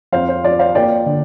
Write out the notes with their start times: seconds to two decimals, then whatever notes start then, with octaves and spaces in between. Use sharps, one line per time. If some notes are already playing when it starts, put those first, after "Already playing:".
0.13 F2 C5 F5
0.28 C5
0.44 F3 D5
0.59 C5 F5
0.75 A#3 D5 G5
1.06 D3